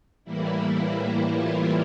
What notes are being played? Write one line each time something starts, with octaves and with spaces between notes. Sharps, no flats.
A2 E3 G3 A#3 E4
E4
F4